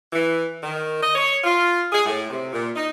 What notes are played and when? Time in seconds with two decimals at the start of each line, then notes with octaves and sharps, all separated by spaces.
0.13 E3
0.63 D#3
1.02 D#5
1.15 C#5
1.44 F4
1.92 G#4
2.06 A2
2.30 C3
2.53 A#2
2.76 D#4